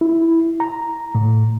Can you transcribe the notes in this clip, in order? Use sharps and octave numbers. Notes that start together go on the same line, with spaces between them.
E4
A#5
A2